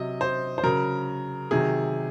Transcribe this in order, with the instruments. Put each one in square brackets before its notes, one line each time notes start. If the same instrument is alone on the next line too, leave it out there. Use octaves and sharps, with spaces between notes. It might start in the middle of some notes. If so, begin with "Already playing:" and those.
Already playing: [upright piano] C3 F#3 D#5
C5
C5
C#3 F#3 A#4
C3 D#3 F#3 G#4